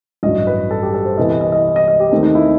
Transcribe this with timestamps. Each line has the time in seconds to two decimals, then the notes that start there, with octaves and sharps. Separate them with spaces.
0.23 A1 G2 F#3 D#5
0.47 B4
0.70 A4
0.83 G4
0.94 A4
1.05 C5
1.17 C2 C3 E3 B3 D#5
1.41 D#5
1.52 D#5
1.76 D#5
1.88 D#5
2.00 G4
2.11 D#2 D#3 A3 C4
2.23 D#4
2.35 E4